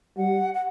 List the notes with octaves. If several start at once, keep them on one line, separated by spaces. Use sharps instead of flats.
G3 F#5
F#5